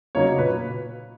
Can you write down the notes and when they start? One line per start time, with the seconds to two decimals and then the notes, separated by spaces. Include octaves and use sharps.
0.15 C#3 F#3 A#3 D#4 C#5
0.38 A#2 B4